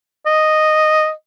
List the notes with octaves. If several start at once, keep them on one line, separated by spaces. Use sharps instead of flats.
D#5